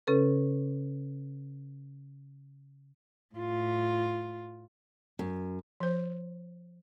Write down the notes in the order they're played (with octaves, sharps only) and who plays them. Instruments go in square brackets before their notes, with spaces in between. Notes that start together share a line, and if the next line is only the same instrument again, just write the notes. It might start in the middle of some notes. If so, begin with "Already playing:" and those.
[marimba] C#3 C#4 A4 B4
[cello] A2 F4
[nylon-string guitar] F#2
[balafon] F3 C5